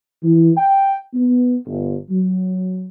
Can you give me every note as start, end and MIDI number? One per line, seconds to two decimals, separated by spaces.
0.23 0.51 52
0.56 0.95 79
1.13 1.56 59
1.66 1.95 31
2.10 2.89 54